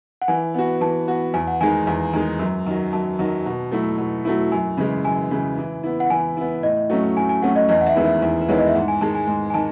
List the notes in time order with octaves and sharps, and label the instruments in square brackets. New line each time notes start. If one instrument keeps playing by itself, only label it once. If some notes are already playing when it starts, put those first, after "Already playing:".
[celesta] F#5
[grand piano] E3 [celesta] G#5
[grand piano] B3 F#4
[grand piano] E3 [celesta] A5
[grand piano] B3 F#4
[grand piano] E2 [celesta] G#5
[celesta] F#5
[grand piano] D#3 G#3 D#4 [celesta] G#5
[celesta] G#5
[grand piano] E2 [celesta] G#5
[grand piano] D#3 G#3 D#4
F#2
D#3 F#3
[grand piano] F#2 [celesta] A5
[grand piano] D#3 F#3
B2
F#3 A3 E4
B2
F#3 A3 E4
[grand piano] F#2 [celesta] G#5
[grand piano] C#3 E3 G#3
[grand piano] F#2 [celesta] G#5
[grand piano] C#3 E3 G#3
E3
B3 E4
[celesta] F#5
[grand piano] E3 [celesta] G#5
[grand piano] B3 E4
[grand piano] A2 [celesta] D#5
[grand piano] F#3 A3 C#4
[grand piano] A2 [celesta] G#5
[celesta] G#5
[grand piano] F#3 A3 C#4 [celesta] F#5
[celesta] D#5
[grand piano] E2 [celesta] D#5
[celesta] F#5
E5
[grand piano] D#3 G#3 B3 E4
[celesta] E5
[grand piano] E2
[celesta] B4
[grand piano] D#3 G#3 B3 E4 [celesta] C#5
[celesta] D#5
E5
[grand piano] G#2 [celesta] F#5
[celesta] G#5
[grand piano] D#3 G#3 [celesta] A5
[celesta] G#5
[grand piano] G#2 [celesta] G#5
[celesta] G#5
[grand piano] D#3 [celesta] A5